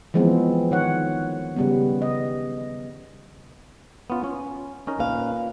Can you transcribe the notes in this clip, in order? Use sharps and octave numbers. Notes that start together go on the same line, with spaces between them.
E3 F3 G#3 B3 C4
D#3 C#5 F#5
C#3 G3 B3
D#5
B3 C#4 F4
C#4
C#4 D#4 A#4
A#2 B4 F5